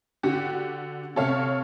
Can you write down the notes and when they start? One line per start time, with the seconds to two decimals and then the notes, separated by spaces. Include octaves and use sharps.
0.23 D3 F#4 G4
1.16 C3 A4 C#5 F5